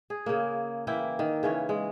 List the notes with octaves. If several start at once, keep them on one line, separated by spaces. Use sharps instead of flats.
G#4
C#3 A#3
E3 A#3 E4 G5
D#3
C#3 E3 C#4
G#3